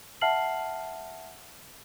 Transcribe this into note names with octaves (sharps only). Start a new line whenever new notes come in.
E5 F#5 A5 F6 C7 F#7